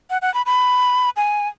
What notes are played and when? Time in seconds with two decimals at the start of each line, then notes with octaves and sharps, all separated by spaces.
0.10 F#5
0.22 F#5
0.34 B5
0.46 B5
1.17 G#5